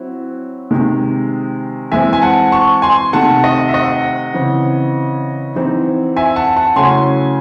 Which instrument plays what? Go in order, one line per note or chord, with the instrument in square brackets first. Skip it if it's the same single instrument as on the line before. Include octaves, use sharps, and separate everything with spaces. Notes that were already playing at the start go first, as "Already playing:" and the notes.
Already playing: [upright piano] F#3 C4 E4
C3 D#3 G#3
E3 G#3 C4 E5 G#5
G#5
F#5 A5
A5 C#6
G#5 C6
C3 D#3 A3 F#5 A5
D#5 F#5
E5
D#5 F#5
C#3 E3 C4
E3 C4 D#4
E5 G#5
F#5 A5
F#5 A5
C#3 F#3 A3 C#4 E4 G#5 C6